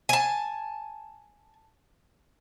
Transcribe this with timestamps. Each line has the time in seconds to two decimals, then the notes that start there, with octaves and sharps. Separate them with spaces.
0.09 G#5 A5